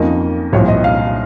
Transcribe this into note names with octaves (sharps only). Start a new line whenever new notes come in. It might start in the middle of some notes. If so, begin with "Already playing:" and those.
Already playing: F2 D#3 A#3 C#4 D#5
C2 A#2 F3 C#5
D#5
F5